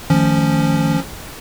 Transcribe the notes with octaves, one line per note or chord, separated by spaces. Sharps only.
D#3 F3 A3 C#4